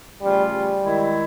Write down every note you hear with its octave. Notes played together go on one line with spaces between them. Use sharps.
C#3 F3 G3 A3 C#4 F4
G3
D#3 G#3 C4 E4